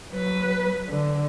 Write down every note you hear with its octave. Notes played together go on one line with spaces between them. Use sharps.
F#3 B4
D3